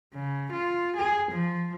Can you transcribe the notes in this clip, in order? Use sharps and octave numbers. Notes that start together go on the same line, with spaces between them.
C#3
F4
G#4
F3